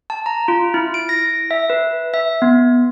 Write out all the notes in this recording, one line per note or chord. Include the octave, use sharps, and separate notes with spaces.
A5
A#5
F4
E4
D7
A#6
E5
B4
E5
B3